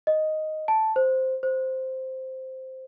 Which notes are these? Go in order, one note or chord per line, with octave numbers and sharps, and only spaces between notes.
D#5
A5
C5
C5